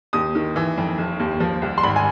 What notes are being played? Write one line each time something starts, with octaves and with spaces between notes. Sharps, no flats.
D#2 D#6
D#3
E3
F2
F1
D#2
F3
C2
C6
G#1 B5
G#5